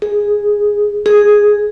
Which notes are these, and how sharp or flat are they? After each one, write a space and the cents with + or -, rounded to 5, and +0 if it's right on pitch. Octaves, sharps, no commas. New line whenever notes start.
G#4 -5
G#4 +0